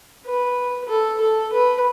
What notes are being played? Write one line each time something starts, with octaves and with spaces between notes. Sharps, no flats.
B4
A4
A4
B4